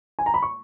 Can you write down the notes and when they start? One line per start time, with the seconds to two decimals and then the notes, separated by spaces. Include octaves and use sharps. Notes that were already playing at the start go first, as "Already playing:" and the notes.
0.19 G#5
0.26 A#5
0.34 B5
0.42 C#6